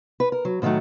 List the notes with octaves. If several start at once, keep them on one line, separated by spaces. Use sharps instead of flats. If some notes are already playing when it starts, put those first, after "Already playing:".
B4
A#4
F#3
A2 D3 D#3 F#3 A3